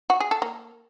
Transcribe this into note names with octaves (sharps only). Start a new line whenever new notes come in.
F#4
G#4
A4
A#3